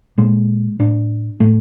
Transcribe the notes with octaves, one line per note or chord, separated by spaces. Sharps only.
A#2 G#3
A2 D4
A2 A3